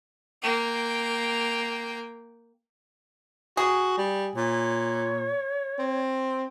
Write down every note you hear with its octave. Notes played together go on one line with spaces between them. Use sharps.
A#3 G5
F#4 G#4
G3
A#2 C#5
C4